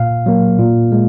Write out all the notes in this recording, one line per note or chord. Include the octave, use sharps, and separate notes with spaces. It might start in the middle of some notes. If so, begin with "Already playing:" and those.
Already playing: A#2 F5
F#3 A#3
A#2
G#3